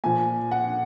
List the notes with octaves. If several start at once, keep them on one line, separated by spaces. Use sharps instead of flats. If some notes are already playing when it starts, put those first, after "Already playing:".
A#2 F3 G#5
F#5